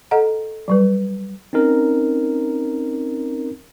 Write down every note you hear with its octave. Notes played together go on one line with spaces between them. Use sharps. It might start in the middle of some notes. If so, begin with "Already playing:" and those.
A4 D#5 F#5 A#5
F#3 G3 B4
C4 C#4 D#4 A#4